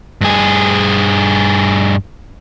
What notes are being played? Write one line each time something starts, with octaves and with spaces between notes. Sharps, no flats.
G2 G#4